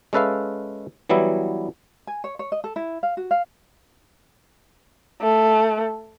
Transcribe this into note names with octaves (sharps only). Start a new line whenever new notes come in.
G#3 C#4 A4 B4 E5 F5
E3 F#3 G3 B3 E4
G#5
C#5
C#5
D#5
A4
E4
F5
F#4
F5
A3